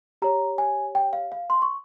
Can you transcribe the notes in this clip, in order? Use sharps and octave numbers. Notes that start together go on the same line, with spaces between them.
G4 C#5 A#5
G#5
G5
F5
F5
C6
C#6